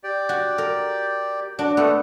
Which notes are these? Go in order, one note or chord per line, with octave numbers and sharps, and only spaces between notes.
G4 D5
F#4
A#4
D4 F#4 D6
A3 B3